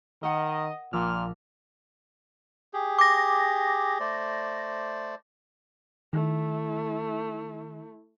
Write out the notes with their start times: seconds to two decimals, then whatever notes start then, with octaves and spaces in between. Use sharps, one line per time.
0.23 D#3 A#4 D#5 F#5
0.93 A#1 A#2 D6 E6 F6
2.73 G4 G#4
2.99 D6 A#6
4.00 A3 C5 D5
6.13 D#3 A3 E4